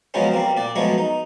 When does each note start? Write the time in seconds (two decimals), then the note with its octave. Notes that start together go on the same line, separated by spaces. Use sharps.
0.14 C#3 F3 F#3 G#3 B3 C#4
0.31 G3 A#3 C4
0.57 A#2 D5
0.76 F3 F#3 G#3 A3 B3 C#5
0.98 D#4